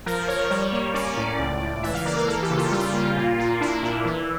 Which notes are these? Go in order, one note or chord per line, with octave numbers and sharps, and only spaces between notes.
F3 A#4
F3 C#5
G3 C#5
A#3
C#4 D5
A2
C#2
C#2
E3 E5
F5
A#3 D5
A#4
E3 A4
G4
C#3
F4
G3 G4
F4
A#3
A#2
A#3
D4 E4
A#2
E3